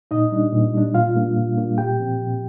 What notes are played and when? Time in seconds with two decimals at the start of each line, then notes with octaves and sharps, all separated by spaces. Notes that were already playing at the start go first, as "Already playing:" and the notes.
0.11 A#2 D#4 D#5
0.32 G3 D4
0.53 A#2
0.74 G3 D4
0.94 A#2 F4 F5
1.15 G3 A#3 D4
1.36 A#2
1.57 G3 A#3 D4
1.78 A#2 G4 G5
1.99 F3 C4
2.20 A#2